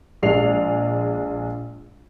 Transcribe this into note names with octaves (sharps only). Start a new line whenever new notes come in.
A#1 G#3 D5 C7 F7